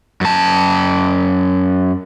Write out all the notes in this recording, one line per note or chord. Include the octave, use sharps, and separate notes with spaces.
F#2 A5